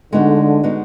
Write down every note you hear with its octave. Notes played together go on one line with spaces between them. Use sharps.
D3 G#3 B3 D#4 F#4
G#3 B3 D#4 F#4